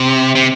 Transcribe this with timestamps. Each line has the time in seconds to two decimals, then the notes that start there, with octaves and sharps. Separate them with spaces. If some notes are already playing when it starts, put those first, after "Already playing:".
Already playing: C3
0.35 C3